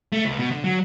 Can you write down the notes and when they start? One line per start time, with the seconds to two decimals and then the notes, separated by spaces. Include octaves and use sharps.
0.12 A3
0.25 C#2
0.38 B2
0.52 D3
0.64 F#3